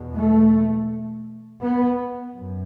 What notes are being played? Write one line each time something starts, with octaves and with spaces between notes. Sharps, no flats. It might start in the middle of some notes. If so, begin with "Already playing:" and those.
Already playing: E2 B2
A3
B3
F#2